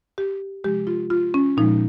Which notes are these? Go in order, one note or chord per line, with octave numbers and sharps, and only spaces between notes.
G4
C3 F3 G#3 G4
F4
F4
C#4
A#2 F3 G#3 D#4